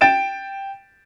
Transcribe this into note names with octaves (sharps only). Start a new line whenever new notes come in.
G5 A6 D7 E7